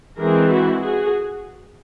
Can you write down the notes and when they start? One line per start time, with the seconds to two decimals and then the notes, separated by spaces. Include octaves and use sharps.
0.19 E3 G#3 C4 G#4 A#4
0.50 E4 F#4
0.81 F#4 G#4